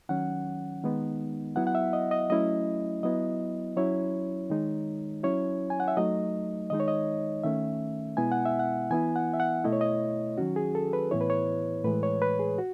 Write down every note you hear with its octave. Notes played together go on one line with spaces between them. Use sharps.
D#3 F#3 C#4 F#5
D#3 G#3 B3 D#4
F#3 B3 E4 F#5
F#5
E5
D#5
D#5
F#3 A3 C#4 E4 D#5
F#3 B3 E4 D#5
F#3 C#4 E4 C#5
D#3 G#3 D#4
F#3 C#4 E4 C#5
G#5
F#5
E5
F#3 A3 D#4 D#5
D#3 G#3 D#4 D#5
C#5
D#5
D#3 A3 C#4 E5
B2 G#3 B3 E4 G#5
F#5
E5
F#5
E3 B3 E4 G#5
F#5
E5
F#5
B2 A3 E4 D#5
C#5
D#5
D#3 F#3 C#4 F#4
G#4
A4
B4
A2 E3 B3 E4 C#5
B4
C#5
A2 E3 G#3 B4
C#5
B4
G#4
F#4